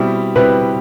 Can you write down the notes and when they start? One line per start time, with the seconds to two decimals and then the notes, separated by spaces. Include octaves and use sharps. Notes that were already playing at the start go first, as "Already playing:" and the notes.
Already playing: B2 G3 C4 E4 G4
0.35 B2 G3 C4 E4 G4 B4